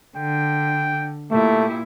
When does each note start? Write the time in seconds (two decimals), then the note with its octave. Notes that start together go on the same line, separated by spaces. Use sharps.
0.17 D3 G5
1.31 A#2 A3 E4 G4